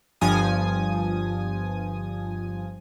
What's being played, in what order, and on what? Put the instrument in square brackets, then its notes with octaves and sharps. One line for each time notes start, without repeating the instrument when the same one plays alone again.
[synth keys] G1 G2 F3 G#5 D#6